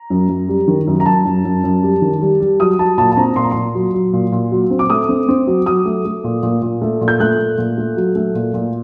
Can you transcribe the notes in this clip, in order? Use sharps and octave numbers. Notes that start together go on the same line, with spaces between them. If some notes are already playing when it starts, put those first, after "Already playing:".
Already playing: A#5
F#2
F#2
G3
D#3
F#2
A#5
F#2 A5
F#2
F#2
F#2
G3
D#3
G3
G3
F#3 D#6
F#3 A5
A#2 A5
A5
C4 A#5
A#2 C6
A#5
A#2 C6
F#3
F#3
A#2
A#2
F#3
C4
D6
A3 D#6
C4
C4
F#3
F#3 D#6
A3
A3
A#2
A#2
A#2
A3
A#2
G6
A3 F#6
A#2
A#2
A3
F#3
A3
A#2
A#2